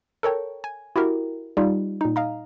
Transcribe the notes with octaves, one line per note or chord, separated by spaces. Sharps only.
A4 A#4 C#5 G5
G#5
E4 F#4 G4 A#4
G3 D#4 F4
A#2 D#4
D#5 F5 A#5